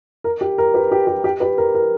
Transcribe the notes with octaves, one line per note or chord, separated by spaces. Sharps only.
A#4
G4
A#4
G4 B4
G4
G4
G4
G4 B4
A#4
A#4